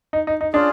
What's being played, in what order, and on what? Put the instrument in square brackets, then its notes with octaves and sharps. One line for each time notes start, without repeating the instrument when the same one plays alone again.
[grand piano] D#4
D#4
D#4
[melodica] C#4 F4 G#4 [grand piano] D4